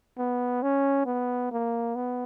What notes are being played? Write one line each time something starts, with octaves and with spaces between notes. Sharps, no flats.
B3
C#4
B3
A#3
B3